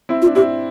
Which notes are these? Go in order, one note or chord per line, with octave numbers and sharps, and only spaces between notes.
C4 E4
F4
D4
C4 E4 G4